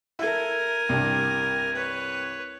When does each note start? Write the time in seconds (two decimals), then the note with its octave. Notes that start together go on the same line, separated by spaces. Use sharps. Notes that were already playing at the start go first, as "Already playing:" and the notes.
0.19 E4 A4 A#4 G#5
0.89 C2 G2
1.74 B4 C#5